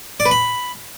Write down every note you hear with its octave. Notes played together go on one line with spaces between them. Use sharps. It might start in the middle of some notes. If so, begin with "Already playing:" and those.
D5
B4
B5